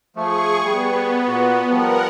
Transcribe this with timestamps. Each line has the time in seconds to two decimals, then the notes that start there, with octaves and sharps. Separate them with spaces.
0.16 F3 A3 G#4 C#6
0.64 G3 B3
1.27 A#2 F#4
1.70 F3 G3 B3 A#4 F#5